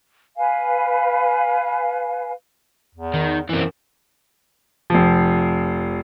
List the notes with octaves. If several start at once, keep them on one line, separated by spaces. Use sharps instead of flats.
B4 F5 G#5
E2
D#3
F#2 E3 C4
F1 F3